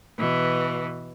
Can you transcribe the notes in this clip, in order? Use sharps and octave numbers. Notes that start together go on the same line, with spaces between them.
B2 E3